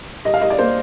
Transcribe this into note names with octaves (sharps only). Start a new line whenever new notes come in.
G3 D#5
F5
G3 D#5
D5
A#3 C5